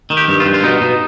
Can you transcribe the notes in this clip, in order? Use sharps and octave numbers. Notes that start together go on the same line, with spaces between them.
D#3
G4
G2
F4
G2
F4
B2 D#4
B2